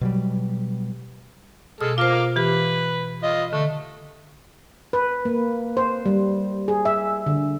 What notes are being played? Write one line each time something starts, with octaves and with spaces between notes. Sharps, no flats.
B2 F#3 G3
B2 G#3 A4 F6
A#3 F4 C5 F5 D6
E3 G4 B4
F4 D#5
D3 A3
B4
A#3
C5
G3
G#4
E5
D3